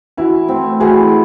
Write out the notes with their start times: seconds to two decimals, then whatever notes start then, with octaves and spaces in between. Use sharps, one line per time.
0.17 E3 E4 F#4
0.49 A3 C4
0.80 E3 F#4 G#4